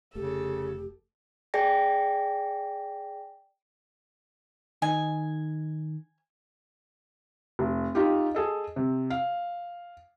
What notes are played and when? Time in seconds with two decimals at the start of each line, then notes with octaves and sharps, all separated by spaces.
0.15 F1 C#3 A3 G4 A4
1.54 G#4 D5 G5 G#5 A#6
4.82 D#3 D#4 D#5 G#5
7.59 F1
7.95 D#4 F4 G4
8.35 G#4 A4 D#5
8.76 C3
9.10 F5